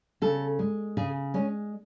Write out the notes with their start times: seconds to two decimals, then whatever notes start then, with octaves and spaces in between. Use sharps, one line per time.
0.22 C#3 A4
0.59 G#3
0.97 C#3 G#4
1.34 G#3 C#4